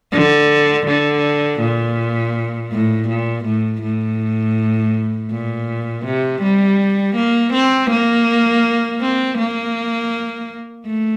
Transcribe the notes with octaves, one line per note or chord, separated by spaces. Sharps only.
D3
D3
A#2
A2
A#2
A2
A2
A#2
C3
G3
A#3
C4
A#3
C4
A#3
A3